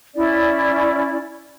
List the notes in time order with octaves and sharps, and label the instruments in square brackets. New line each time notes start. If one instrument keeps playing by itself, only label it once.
[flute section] C#4 E4 D5